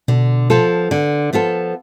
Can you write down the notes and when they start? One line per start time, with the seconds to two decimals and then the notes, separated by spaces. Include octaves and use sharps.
0.08 B2 D3
0.50 F3 B3 F4 A4
0.91 D3
1.33 F3 B3 F4 A4